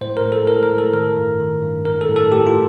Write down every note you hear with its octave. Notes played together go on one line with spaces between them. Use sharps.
A2 C5
A#4
A2
A4
A2 A#4
A#4
A2
A4
D#3 A#4
G2
D#3
G2
A2 A#4
A4
A2
A4
A2 G4
F4